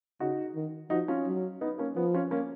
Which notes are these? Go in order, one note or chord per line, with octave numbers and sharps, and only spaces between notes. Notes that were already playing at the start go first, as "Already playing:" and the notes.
C#3 D#4 F#4
D#3
F3 D#4 F#4
C#4 F4
F#3
B3 D#4
A#3 C#4
F3 B3
C#4 F4
A#3 C#4